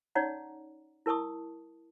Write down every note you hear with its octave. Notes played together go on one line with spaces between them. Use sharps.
C#4 D#4 C#5 D5 F#5 A#5
E4 A#4 A5 C#6 D#6